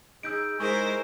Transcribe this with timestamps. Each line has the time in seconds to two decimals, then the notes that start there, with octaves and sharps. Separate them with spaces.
0.23 D#4 G#4 E6 G6 D7
0.60 G#3 D#4 E4 G#4 A#4 C5 C#6